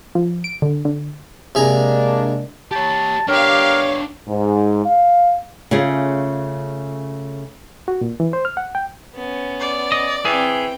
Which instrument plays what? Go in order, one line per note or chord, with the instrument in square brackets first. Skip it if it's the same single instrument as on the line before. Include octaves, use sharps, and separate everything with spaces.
[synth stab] F3
D7
D3
D3
[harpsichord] C3 G#4 A#5 [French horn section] G#3 A#3 D4
[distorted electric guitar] G4 C#5 [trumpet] A5
[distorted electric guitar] B3 D4 [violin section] G4 F5 [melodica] A#4 [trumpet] C#5
[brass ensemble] G#2
F5
[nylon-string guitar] C#3 A3 C#4 F4 G#4
[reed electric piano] F#4
A#2
E3
C5
F6
F#5
G5
[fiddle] B3 C#4
[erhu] D5
[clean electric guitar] D#5
[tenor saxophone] E3 [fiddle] C4 G5 [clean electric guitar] G#4